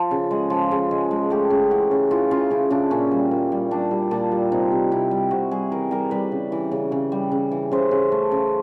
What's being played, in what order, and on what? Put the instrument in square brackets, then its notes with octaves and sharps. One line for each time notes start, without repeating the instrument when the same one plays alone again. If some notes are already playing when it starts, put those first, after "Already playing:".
Already playing: [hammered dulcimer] F3 A4
C#3
G#3
F3
C#3
G#3
G#3
A3 G4
C#3
E3 F#4
C#3
E3 F4
C#3 F4
C#3 E4
C#3 D4
A#2 C#4
G3
A#2
G3
G3 D4
G3
A#2 D4
G3
C3 D#4
C3
C3 E4
G3
C3 F#4
G3 G#4
E3 A#4
G3 A#4
G3 B4
C#3
E3
C#3
C#3
G3
C#3
E3
C#3 C5
C#3
A3
C#3